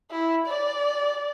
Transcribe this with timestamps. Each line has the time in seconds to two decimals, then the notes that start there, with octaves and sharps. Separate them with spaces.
0.11 E4
0.46 D5